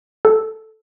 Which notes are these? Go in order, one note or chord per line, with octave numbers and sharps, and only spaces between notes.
A4